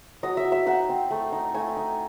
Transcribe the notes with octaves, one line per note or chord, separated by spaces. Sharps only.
F#3 D#5
E5
F#3
E5
D#4 F#5
C4
A3
D#4
A3 G#5
D#4